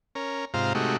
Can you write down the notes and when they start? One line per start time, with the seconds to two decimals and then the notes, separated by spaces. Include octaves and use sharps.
0.15 C#4 A#4
0.54 G#2 C3 F4 C5 F5 A#5
0.75 C3 G#3 A3 D#4 F#4 G4